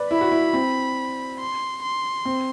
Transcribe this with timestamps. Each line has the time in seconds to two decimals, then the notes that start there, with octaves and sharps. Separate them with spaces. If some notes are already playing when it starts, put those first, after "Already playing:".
Already playing: B4 D5
0.10 E4 B5
0.21 F#4
0.32 E4
0.53 C4
1.39 C6
1.83 C6
2.25 C4